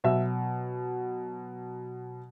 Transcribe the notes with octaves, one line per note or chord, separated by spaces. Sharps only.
B2 F#3 E5